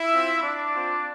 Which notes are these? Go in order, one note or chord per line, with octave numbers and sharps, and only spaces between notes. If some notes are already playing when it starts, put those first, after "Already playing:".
Already playing: E4 E5
C4 F4
D4 D5
C4 F4